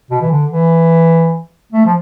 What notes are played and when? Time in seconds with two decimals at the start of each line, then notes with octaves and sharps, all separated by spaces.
0.11 B2
0.22 E3
0.31 D3
0.51 E3
1.72 A3
1.85 F3